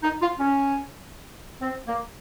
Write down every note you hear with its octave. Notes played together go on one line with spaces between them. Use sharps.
D#4
F4
C#4
C4
A#3